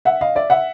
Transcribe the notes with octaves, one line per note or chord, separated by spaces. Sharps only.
E5 F#5
D#5 F5
D5 E5
E5 F#5